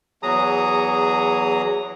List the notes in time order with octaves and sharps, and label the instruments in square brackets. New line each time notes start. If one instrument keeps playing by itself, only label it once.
[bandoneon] E2 F#3 G#4 A#5 D#6